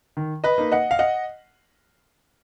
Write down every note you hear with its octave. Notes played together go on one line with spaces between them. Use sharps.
D#3
B4 D#5
A#3 D#4
D#5 F#5
F5
D#5 F#5